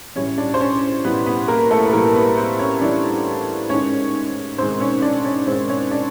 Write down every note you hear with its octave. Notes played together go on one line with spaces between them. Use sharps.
A2 E3 G3 C#4 C#5
D4 D5
C5
C#4 C#5
A2 E3 G3 B3 B4
B3 B4
A#3 A#4
A3 A4
B4
A2 E3 G3 A#3 A#4
B3 B4
C4 C5
C#4 C#5
A2 E3 G3 D4 D5
G#2 D#3 G#3 C#4 C#5
G#2 D#3 G#3 C4 C5
C#4 C#5
D4 D5
C#4 C#5
G#2 D#3 G#3 C4 C5
C#4 C#5
D4 D5